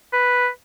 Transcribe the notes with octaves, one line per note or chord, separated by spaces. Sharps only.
B4